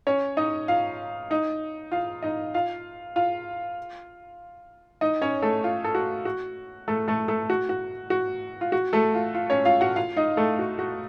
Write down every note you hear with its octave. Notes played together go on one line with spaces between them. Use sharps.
C#4 C#5
D#4 D#5
F4 F5
D#4 D#5
F4 F5
D#4 D#5
F4 F5
F4 F5
D#4 D#5
C#4 C#5
A3 A4
F4
A4
F#4
F#4
A3 A4
A3 A4
A3 A4
F#4
F#4
F#4
F4
F#4
A3 A4
F4
F4
C#4 C#5
F4 F5
F#4 F#5
F4 F5
D#4 D#5
A3 A4
F#4
F#4